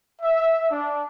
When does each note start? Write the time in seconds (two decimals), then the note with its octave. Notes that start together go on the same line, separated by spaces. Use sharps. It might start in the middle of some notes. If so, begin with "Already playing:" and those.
0.22 E5
0.71 D4